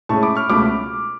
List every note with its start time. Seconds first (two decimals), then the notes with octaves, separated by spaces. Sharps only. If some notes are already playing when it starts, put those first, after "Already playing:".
0.09 A2 G#3 C#4 A5 C#6
0.23 B5 D6
0.35 C#6 F6
0.49 C#2 B2 A3 C#4 B5 D6